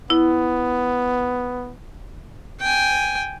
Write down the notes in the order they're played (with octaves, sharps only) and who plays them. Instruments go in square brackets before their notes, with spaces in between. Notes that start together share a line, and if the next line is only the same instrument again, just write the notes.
[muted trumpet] B3 [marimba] E4
[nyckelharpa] G5 G#5